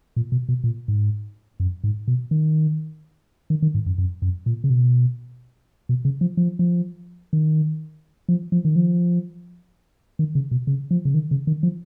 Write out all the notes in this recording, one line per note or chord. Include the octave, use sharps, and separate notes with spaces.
A#2
B2
B2
A#2
G#2
F#2
G#2
B2
D#3
D#3
D#3
G#2
F#2
F#2
F#2
A#2
C#3
B2
B2
C#3
F3
F3
F3
D#3
F3
F3
D#3
F3
D#3
C#3
B2
C#3
F3
C#3
D#3
C#3
D#3
F3